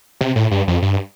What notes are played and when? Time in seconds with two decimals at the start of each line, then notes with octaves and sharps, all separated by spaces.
0.21 C3
0.36 A2
0.51 G2
0.68 F2
0.82 G2